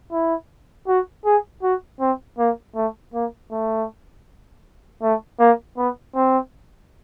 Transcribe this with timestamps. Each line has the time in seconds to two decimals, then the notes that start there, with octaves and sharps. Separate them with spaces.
0.12 E4
0.88 F#4
1.25 G#4
1.63 F#4
2.00 C4
2.38 A#3
2.75 A3
3.14 A#3
3.51 A3
5.02 A3
5.40 A#3
5.77 B3
6.15 C4